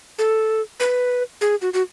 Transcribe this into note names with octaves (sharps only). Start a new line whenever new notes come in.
A4
B4
G#4
F#4
F#4